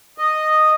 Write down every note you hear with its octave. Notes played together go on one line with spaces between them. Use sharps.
D#5